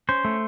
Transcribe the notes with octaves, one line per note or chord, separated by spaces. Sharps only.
C#4 C5
A3